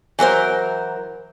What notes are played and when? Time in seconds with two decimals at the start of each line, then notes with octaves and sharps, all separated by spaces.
0.19 E3 F#3 A#4 C5